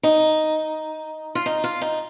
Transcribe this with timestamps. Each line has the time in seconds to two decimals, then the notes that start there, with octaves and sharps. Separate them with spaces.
0.03 D#4
1.35 F4
1.46 D#4
1.64 F4
1.82 D#4